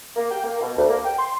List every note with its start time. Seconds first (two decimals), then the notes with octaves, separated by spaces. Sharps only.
0.16 A#3
0.31 G5
0.44 A#3
0.61 B2
0.77 D2
0.90 A#3
1.05 G5
1.18 C6